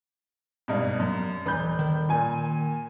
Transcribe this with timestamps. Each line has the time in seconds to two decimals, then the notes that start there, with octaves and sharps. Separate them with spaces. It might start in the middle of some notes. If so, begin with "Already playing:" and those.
0.68 G#1 G2 B2
1.00 F#2
1.46 D#1 E3 B5 G6
1.79 D#3
2.09 A#2 A#3 G#5